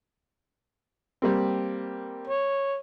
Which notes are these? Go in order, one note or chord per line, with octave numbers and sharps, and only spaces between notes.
G3 A#3 C4
C#5